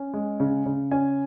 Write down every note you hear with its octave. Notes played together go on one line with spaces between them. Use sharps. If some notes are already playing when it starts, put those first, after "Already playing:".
Already playing: C#4
G#3
C#3
C#3
C#4 G#5